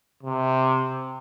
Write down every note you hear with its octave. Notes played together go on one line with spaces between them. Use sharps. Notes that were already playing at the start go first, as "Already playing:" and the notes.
C3